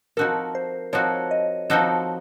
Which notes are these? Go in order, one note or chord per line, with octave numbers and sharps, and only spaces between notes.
F3 C4 D#4 F#4 A4 A#4
C5
F3 C4 D#4 F#4 A4 C#5
D#5
F3 C4 D#4 F#4 A4